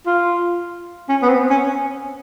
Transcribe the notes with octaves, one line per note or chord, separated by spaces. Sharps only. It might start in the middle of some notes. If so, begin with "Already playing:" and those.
F4
C#4
B3
C4
C#4